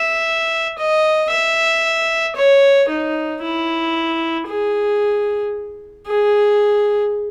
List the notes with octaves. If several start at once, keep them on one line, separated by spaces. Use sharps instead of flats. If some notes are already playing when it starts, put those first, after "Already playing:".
Already playing: E5
D#5
E5
C#5
D#4
E4
G#4
G#4